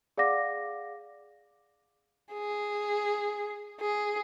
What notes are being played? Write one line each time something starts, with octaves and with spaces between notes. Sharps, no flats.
G#4 D5 F5 F#5 D6 A#6
G#4
G#4